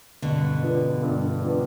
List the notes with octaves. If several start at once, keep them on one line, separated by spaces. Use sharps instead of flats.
G2 B2 D3
F3 B3 D4
G2
F3 B3 D4